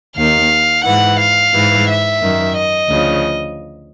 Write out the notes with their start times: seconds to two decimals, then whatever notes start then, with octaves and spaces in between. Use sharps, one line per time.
0.17 D#2 D#3 F5
0.85 G#2 E3 F#5
1.19 F5
1.53 G#2 E3
1.88 E5
2.22 F#2 D#3
2.56 D#5
2.90 D2 C#3 F3